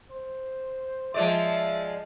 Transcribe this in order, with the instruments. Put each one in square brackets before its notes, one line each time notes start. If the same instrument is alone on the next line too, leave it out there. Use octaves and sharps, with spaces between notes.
[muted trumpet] C5
[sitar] F3 G#3 D5 [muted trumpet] E5